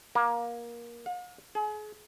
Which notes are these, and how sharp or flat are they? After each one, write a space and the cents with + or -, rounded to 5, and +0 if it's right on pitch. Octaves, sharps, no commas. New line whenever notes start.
A#3 +20
F5 +45
G#4 +35